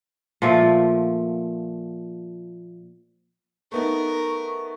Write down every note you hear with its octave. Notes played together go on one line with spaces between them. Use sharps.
A#2 F3 A3
A3 B3 D#4 A#4 C#6